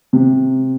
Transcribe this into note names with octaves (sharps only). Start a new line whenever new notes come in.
C3